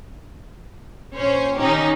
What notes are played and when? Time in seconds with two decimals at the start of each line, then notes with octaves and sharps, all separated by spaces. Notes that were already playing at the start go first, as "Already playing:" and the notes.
1.16 A#1 C#4 C5 C#5
1.58 D#3 C#4 D#4 G4